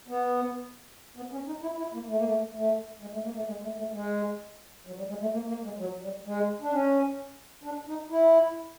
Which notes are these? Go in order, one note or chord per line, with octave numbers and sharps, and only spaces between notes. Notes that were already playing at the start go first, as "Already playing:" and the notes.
B3
B3
C#4
D#4
E4
E4
A#3
A3
A#3
A3
A3
G#3
A3
A#3
A3
G#3
A3
A3
G#3
F#3
G3
G#3
A3
A#3
A#3
G#3
F#3
G3
G#3
D4
C#4
D4
D#4
E4